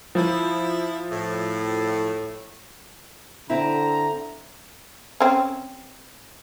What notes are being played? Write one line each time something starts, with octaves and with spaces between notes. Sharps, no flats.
F3 E4
A2
D3 C4 E4 A#5
C4 C#4